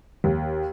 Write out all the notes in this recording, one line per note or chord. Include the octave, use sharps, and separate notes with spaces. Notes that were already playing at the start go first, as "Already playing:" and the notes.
D#2